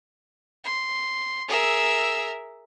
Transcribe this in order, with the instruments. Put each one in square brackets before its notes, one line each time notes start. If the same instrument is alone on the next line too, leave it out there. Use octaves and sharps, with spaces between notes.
[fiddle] C6
[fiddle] G#4 E6 [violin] A#4 E5